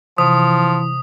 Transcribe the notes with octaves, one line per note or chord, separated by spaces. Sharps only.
C3 E3 F3 D#6